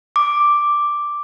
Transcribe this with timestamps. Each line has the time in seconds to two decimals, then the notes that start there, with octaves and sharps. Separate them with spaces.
0.16 D6